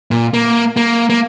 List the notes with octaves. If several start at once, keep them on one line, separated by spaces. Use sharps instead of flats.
A#2
A#3
A#3
A#3